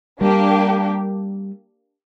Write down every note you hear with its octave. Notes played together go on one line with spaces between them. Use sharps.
G3 A#3 D4 G4